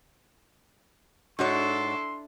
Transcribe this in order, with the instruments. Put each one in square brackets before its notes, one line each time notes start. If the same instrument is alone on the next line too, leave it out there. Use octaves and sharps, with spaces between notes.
[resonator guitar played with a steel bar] G#2 F#4 C#5 [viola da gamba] D4 E4 A4 [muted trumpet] C6